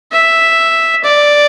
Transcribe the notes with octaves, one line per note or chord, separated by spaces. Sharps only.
E5
D5